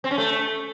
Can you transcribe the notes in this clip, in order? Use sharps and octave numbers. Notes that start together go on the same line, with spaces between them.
C4
C#4
A3